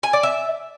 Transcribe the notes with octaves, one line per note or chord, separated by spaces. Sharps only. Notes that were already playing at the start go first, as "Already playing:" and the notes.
G#5
D5
E5